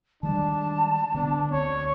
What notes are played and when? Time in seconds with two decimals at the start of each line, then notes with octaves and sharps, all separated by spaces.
0.23 D#3 G3 G#3 D4 A5
1.14 D3 B3 D4
1.51 D2 C4 C#5